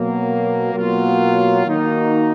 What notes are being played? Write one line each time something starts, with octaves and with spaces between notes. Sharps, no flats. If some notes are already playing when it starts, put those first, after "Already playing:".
Already playing: B2 F#3 A#3
B2 F#3 A#3 F4
D#3 A#3 D#4 F#4